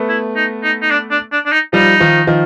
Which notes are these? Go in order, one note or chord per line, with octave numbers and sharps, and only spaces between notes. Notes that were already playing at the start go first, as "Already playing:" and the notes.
Already playing: A3 B3
E4
D#4
D#4
D#4
D4
D4
D4
D4
D#4
F3 G3 D#4
D#3 F3
D#3 F3